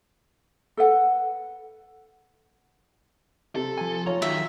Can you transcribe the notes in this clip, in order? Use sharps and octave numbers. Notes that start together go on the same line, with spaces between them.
A4 B4 F#5
C3 A4
F3 G#5
F4 C#5 A#5
D#3 F#3 E5